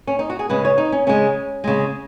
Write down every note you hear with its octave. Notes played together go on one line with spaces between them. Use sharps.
C#4
D#4
F#4
G#4
C#3 G#3 B4
C#5
D#4
C#4
C#3 G#3 C#4
C#3 G#3